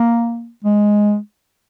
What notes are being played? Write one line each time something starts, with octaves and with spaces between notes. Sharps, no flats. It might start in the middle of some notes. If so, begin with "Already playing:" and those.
Already playing: A#3
G#3